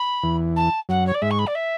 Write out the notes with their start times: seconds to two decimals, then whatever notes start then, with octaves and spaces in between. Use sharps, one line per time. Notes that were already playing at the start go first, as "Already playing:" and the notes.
Already playing: B5
0.23 E2 E3
0.56 A5
0.89 F#2 F#3 F#5
1.07 C#5
1.14 D5
1.22 G#2 G#3 E5
1.31 C#6
1.39 B5
1.47 D5
1.55 E5